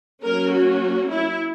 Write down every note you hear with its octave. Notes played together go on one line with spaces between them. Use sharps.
F#3 A#3 C#4 A#4
F#4
E4